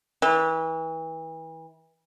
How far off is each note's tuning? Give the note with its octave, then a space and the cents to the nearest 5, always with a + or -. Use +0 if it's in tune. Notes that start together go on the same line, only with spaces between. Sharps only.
E3 -30